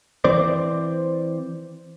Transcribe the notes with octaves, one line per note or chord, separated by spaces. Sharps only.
E3 C4 C5 D5